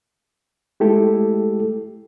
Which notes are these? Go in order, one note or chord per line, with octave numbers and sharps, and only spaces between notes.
G#3 A3 E4 G4 A4